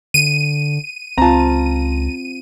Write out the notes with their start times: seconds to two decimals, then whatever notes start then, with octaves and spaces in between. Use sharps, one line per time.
0.14 D3 D#7
1.18 C#2 C4 F4 A5 A#5